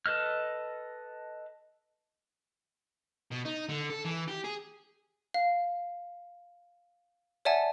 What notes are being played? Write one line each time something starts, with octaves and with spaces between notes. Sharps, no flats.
A4 B4 D#5 F6
B2
D#4
D3
A4
E3
G4
G#4
F5
C#5 D5 E5 F#5 G#5 A5